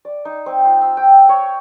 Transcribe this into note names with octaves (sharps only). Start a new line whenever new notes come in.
D5
D#4
C4
F4
E6
G5
C#5